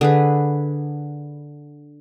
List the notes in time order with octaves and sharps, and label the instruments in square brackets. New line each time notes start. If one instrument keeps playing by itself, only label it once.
[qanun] D3 G#4 B4